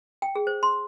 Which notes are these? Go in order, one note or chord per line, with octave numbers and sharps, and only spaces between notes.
G5
G#4
C5
C6